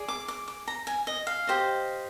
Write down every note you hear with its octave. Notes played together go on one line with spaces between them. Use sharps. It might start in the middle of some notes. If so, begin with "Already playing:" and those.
Already playing: G#4 D5
D6
D6
D6
A#5
G#5
D#5
F5
G4 C5 D#5